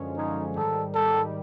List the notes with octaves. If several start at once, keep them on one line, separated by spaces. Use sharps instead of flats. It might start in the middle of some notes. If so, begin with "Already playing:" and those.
Already playing: F#2 D3 F3 G#3 C#4
F#2 D3 F3 G#3 C#4 D#4
G#2 D#3 G3 A4
G#2 D#3 G3 A4